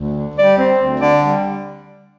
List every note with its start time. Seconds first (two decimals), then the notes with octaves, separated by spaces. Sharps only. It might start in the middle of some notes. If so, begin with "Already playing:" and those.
Already playing: D2
0.15 D3
0.36 G3 D5
0.57 C4
0.79 D2
0.99 D3 D5
1.22 G3